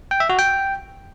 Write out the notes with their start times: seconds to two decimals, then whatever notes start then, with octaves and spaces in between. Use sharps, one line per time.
0.11 G5
0.20 E5
0.29 F#4
0.39 G5